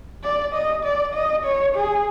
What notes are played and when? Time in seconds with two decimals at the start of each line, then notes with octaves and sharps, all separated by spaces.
0.23 D5
0.54 D#5
0.84 D5
1.14 D#5
1.44 C#5
1.75 G#4